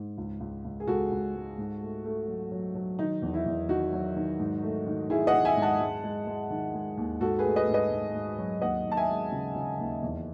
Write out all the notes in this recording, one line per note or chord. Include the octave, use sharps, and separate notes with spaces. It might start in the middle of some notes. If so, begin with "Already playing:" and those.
Already playing: G#2
C#2
C#2
C#2
G#4
C#2 F#4 A4
C#2
G#3
G#2
A3
A3
F#3
F#3
F#3
D#3 D#4
E2
E4
E2
D#3 D#4 F#4
F#3
D#3
G#2
A3
D#3
D#3 E4 G#4
D#5 F#5
D#3
E5 G#5
G#2
F#5 A5
G#3
G#3
G#3
D#3
G#3
D#2
G#2 F#4 A4
G#4 B4
A3
B4 D#5
G#2
B4 D#5
G#2
G#2
F#3
D#2 D#5 F#5
D#2
A5
E5 G#5
G#3
C#3
C#3
D#2
E2